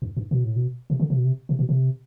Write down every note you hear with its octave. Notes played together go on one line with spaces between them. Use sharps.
F#2
G2
B2
A2
B2
C3
D3
C3
B2
C3
C3
B2
C3